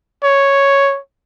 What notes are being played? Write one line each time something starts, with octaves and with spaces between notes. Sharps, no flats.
C#5